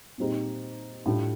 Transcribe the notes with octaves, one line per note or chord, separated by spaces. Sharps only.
A#2 G3 C4 D#4 G4
A2 G3 D4 F4